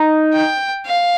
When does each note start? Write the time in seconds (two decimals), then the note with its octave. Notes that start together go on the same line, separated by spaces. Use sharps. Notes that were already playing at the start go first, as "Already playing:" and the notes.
Already playing: D#4
0.33 G5
0.86 F5